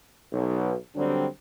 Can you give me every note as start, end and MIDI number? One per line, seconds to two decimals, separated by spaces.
0.32 0.74 35
0.32 0.74 47
0.32 0.74 54
0.95 1.26 43
0.95 1.26 50
0.95 1.26 54
0.95 1.26 55
0.95 1.26 60
0.95 1.26 62